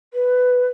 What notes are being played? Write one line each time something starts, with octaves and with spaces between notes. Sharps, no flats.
B4